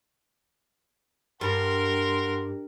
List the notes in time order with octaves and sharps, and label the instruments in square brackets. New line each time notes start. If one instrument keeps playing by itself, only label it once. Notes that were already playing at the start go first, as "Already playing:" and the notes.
[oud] G2 [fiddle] A#4 [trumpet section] F#5 C6